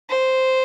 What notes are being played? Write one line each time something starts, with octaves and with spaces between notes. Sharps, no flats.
C5